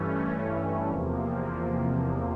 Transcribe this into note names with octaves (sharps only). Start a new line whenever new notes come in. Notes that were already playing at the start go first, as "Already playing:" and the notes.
Already playing: G2 E3 A3 C#4
E2 C3 F3 A#3